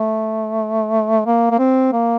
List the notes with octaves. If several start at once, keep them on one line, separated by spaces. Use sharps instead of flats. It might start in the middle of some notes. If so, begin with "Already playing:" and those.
Already playing: A3
A#3
A#3
C4
A#3